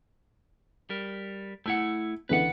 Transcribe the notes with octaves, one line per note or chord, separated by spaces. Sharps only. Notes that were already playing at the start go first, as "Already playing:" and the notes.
G3 A#4
A3 E4 F#5 E6
C#2 D3 E3 B4 F#5